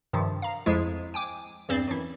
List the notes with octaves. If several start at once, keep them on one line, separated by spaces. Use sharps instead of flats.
G2 C3 D#3 F3
F5 A#5
F2 F3 G#3 E4
G5 G#5 D6
E2 G2 C4 D5 C7
F#2 E3